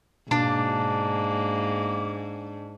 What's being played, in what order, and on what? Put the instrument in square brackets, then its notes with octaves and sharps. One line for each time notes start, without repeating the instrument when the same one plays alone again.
[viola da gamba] G#2 [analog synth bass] B2 [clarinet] A#3 [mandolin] D4